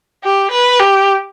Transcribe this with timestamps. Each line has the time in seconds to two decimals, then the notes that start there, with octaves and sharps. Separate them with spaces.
0.24 G4
0.51 B4
0.80 G4